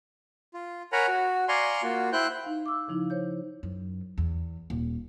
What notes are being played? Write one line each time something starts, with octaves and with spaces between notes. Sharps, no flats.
F4
A#4 C#5 F#5 G#5 A#5 B5
F#4
D5 F5 G#5 A#5 C6 C#6
A#3 F4 F#4
E4 C5 G5 F#6 G6
D#4 F5
D6 E6
C#3 F3 D#4 E4
C5 C#5 G6
F#2
E2
D#1